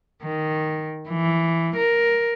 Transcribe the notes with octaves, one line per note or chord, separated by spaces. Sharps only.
D#3
E3
A#4